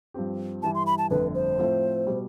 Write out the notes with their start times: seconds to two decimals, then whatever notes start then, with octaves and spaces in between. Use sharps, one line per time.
0.14 G2 F3 C4 G4
0.62 G2 E3 G3 A5
0.75 C6
0.86 B5
0.98 A5
1.10 G1 F2 D3 A3 B4
1.35 C5
1.58 A2 F3 C4
2.07 B2 G3